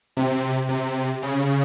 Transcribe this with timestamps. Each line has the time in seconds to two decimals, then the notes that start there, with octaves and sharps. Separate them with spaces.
0.17 C3
0.69 C3
1.22 C#3